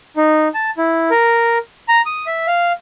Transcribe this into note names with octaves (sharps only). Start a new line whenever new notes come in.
D#4
A5
E4
A#4
A#5
D#6
E5
F5